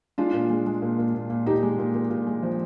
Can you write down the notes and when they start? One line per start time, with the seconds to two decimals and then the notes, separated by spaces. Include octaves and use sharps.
0.18 G#3 D4 F4
0.34 A#2
0.50 G#3
0.66 G#3
0.82 A#2
0.98 A#2
1.14 A#2
1.30 A#2
1.46 A#2 D#4 G4
1.63 G#3
1.79 A#2
1.94 A#2
2.10 A#2
2.27 G#3
2.43 F3